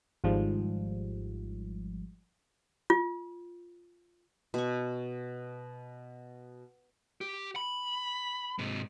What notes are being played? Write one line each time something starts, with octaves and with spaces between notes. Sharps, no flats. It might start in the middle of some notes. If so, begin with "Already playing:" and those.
G#1 G#2 F3 G3
F4
B2 C#6
G4
B5
G#2 C3